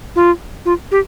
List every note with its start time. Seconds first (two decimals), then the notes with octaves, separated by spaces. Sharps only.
0.16 F4
0.65 F4
0.91 G4